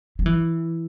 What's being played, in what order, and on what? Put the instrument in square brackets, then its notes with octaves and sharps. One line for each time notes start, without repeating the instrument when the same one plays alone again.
[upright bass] F#3
E3